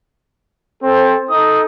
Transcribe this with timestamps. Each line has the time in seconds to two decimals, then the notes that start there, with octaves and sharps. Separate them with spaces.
0.83 C4 A4 C5
1.30 D#4 A4 D#6